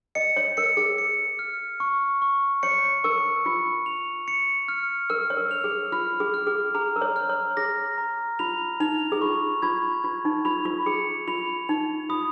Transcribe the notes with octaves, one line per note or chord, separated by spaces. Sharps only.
D#5 C#7
C#5
A#4 C#7
G#4
C#7
F6
C#6
C#6
C#5 C#7
A#4 C#6
F4 C#7
F7
C#7
F6
A#4 F6
C#5
A#4
F7
G#4
F4 F6
G#4
F6
G#4
G#4 A#5
A#4
C#5
F6
C#5
G#4 A#6
A#5
F4 F7
D#4 F7
G#4
F4 C#6
F4 G#6
F4 G#6
D#4
F4 F7
F4
G#4 C#7
F4 F7
D#4 F7
F4 D#6